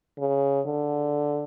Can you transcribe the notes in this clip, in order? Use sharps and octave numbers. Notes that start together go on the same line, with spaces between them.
C#3
D3